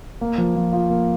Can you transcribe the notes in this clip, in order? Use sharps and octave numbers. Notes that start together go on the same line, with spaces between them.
A#3
F3
F3
F4
A#3